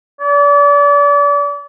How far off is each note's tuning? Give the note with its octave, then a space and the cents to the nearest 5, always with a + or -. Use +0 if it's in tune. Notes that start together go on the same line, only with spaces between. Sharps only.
D5 -35